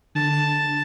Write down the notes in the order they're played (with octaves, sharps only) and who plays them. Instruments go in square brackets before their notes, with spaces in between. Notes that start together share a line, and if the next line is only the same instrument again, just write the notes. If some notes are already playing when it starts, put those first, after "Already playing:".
[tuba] D3 [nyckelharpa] A5